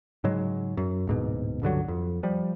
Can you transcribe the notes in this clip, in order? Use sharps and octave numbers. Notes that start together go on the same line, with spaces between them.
G#2 C#3 F#3 G#3
F#2
D1 G#2 B2
C#2 G2 D3 F#3
F2
F3 G3